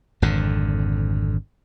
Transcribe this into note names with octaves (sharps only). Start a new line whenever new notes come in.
G#1 F2 D3